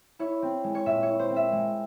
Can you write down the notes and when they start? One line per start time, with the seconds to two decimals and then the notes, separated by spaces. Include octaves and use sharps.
0.19 E4 C#5
0.42 C4
0.64 G#3
0.75 C#5
0.86 A#2 E5
1.03 C#5
1.08 E4
1.19 C5
1.30 C4
1.36 E5
1.52 G#3